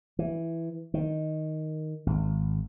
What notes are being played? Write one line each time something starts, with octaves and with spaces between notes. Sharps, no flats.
E3
D#3
G#1